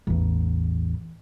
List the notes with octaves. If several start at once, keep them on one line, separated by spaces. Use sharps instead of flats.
A1 E2